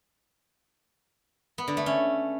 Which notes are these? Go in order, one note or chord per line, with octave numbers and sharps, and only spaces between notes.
B3
D3
A3
C#4